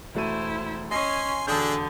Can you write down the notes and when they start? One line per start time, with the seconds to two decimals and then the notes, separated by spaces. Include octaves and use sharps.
0.15 E1 A3 E4 C5 D#7
0.91 C#4 D#5 G#5 C6 C7
1.47 E1 D3 D4 G#4 A4 D#6 G6